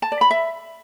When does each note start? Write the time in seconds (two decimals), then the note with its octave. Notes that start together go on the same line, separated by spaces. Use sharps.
0.02 A5
0.12 D5
0.21 B5
0.31 E5